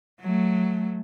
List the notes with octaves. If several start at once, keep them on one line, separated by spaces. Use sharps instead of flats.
F#3 A3